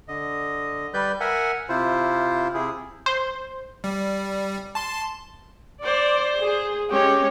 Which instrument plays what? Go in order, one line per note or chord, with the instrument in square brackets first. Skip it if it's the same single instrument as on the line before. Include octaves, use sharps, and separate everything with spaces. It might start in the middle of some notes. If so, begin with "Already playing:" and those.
[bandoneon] D3 D#5
G3 B4 D5 G6
A#4 E5 F#5 G#5
C3 E4 F4 C5
C3 E4 G#4
[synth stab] C5
[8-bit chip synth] G3
A5 C6
[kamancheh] C5 [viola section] D5
[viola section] G#4
[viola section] G#3 C#4 C#5 [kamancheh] G4